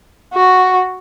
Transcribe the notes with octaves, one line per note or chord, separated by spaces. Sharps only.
F#4